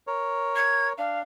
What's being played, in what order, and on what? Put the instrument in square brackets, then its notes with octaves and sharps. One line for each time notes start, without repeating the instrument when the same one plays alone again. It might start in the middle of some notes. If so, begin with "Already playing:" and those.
[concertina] A#4 C#5
[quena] G#6
[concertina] D4 [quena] F5